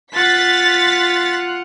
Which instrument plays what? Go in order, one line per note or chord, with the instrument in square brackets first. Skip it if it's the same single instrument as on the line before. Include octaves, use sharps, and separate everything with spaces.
[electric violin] F4 F#5 [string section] A6 B6